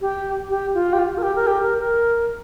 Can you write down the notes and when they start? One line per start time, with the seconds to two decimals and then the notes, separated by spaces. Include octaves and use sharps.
0.01 G4
0.50 G4
0.74 F4
0.93 G4
0.99 F4
1.18 A#4
1.22 G4
1.35 A#4
1.47 G4
1.63 A#4
1.79 A#4